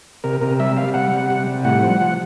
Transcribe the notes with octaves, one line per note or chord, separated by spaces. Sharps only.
C3 A#4
C3 A#4
G3 E5
G3 F5
C3 F#5
G3
C3
G3
A2 F#5
F3
F3